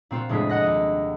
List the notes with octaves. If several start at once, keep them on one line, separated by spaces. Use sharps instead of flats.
A#2 C4 F4 F#4
F1 A2 G#3 D4 G#4 B6
D#5 F#5 F#6 A#6
D#2